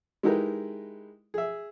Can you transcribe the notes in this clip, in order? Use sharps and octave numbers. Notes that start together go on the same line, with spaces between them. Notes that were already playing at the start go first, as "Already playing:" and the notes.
G#3 D#4 E4 G4 A#4 B4
G#4 E5